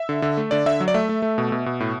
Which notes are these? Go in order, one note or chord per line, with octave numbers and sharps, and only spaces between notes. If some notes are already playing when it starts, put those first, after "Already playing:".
Already playing: E5
D3
D3
A3
D3 D5
D3 E5
F#3
D5
A3 E5
A3
A3
B2
B2
B2
A2